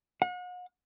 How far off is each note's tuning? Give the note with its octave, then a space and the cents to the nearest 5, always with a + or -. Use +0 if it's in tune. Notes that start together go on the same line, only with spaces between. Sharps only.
F#5 -40